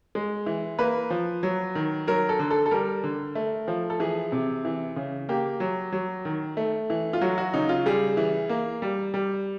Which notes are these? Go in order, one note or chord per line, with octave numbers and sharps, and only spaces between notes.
G#3
E3
A#3 B4
F3
F#3
D#3
F#3 A#4
A4
D3
A4
A4
G3 A#4
D3
A3
F3
A4
E3 G#4
C3
E3
C#3
A#3 G4
F#3
F#3
D#3
A3
E3
F4
F#3 F#4
F#4
C#3 D#4
F4
G3 G#4
E3
A#3
G3
G3